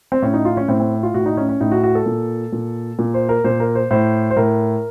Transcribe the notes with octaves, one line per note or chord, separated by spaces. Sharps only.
C4
A2 C#4
D#4
F4
C#4
A2 C4
C4
F4
A2 F#4
D#4
C#4
C#4
A2 D#4
F#4
F#4
A4
A#2
A#2
A#2
C5
A#4
A#2 C5
A#4
C5
A2 C5
C5
A2 A#4